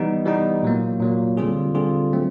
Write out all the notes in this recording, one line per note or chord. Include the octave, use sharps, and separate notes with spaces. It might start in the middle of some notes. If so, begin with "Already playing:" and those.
Already playing: E3 G3 B3 D#4
E3 G3 B3 D#4
A#2 F#3 A#3
A#2 F#3 A#3
D3 G3 C4 F4 G#4
D3 G3 C4 F4 G#4
F#3 A3 C4